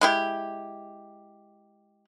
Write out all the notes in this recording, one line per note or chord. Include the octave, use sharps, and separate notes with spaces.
G#3 E4 G4